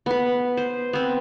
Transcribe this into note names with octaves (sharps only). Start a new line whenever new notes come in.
B3 B4
C5
B3 C4